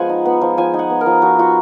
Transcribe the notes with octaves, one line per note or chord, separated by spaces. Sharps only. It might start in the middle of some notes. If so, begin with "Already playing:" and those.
Already playing: F3 G#3 B3 F#5 G#5
D#4
B3
F3
F3 G#5
D#4 G#5
F#5
B3
A#4
F3
F3 F#4
F4 F#4